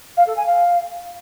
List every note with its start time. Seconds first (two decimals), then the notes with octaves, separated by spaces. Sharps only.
0.17 F5
0.26 A4
0.36 G#5
0.46 F5